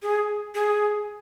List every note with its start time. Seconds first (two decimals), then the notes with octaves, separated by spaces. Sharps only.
0.02 G#4
0.55 G#4